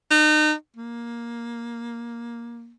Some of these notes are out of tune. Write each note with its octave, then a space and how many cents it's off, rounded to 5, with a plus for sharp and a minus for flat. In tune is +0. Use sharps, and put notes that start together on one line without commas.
D#4 -35
A#3 +10